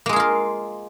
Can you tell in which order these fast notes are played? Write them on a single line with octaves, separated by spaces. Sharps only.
A#3 G#3 G#4 F4 A#4